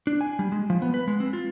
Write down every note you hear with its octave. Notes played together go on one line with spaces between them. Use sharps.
D4
G#5
G3
G#3
F3
B3
B4
G#3
C4
F4